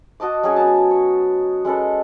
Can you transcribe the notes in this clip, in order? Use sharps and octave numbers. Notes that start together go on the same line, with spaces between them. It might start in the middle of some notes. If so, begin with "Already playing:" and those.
F#4 D#5 A5 D6
F#3 C#4 F#4 G#4
B3 C#4 A5
C#5
G#3 C#4 A4 B4